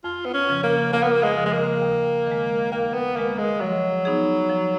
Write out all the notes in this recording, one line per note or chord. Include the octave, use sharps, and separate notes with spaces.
F2 F4
B3
C#4
C#3 F3
A#3
F2 A#3
B3
A#3
G#3
C#3 F3
G#3
A#3
D#2
D#3 G#3
D#2 A#3
B3
D#3 G#3 A#3
G#3
F3 F#3
B3 D#4 G#4
F3